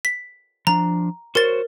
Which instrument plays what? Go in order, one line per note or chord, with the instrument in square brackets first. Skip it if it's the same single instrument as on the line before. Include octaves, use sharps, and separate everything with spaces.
[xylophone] B6
[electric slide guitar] F3 D4 [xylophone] A#5
[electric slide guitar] F#4 C5 C#5 [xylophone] A#4 A6